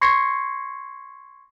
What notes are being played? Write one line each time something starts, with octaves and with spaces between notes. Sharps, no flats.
C6 C#6 G#6 A#6 C7 C#7